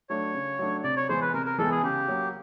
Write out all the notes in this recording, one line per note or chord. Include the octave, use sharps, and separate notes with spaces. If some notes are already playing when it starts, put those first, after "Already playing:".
F#3 A3 D4 C#5
C#3
F#3 A3 D4
C3 D5
C#5
E3 G#3 B3 C5
B4
C3 A#4
A#4
E3 G#3 B3 A4
G#4
C#3 G4
F#3 A#3